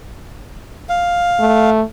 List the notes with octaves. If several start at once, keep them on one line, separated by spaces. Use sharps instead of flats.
F5
A3